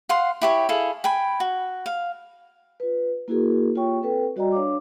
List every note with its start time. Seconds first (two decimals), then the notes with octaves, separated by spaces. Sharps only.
0.09 F5 F#5 C6
0.41 E4 G4 C#5
0.69 E4 G#4 A4 F5
1.04 G5 G#5 B5
1.40 F#4
1.86 F5
2.80 F4 B4
3.28 A#3 E4 F#4 G#4 A#4
3.75 A#3 F4 G4 C#5 G5 C#6
4.02 C4 A4 B4 G5
4.36 G3 F#4 D5 D#5 G5 A#5
4.52 D4 C#5 F5 D6